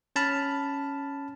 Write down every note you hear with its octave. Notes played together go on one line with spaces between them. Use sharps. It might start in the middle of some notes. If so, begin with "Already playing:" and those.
C#4 A5 B5 F6